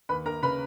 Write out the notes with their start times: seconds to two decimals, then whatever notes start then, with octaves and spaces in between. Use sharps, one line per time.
0.09 D#2 B4 B5
0.26 D#2 A#4 A#5
0.42 C#3 B4 B5